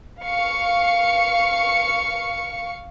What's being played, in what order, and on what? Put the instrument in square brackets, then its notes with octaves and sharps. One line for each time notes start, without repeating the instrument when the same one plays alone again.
[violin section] F5 C#6 C#7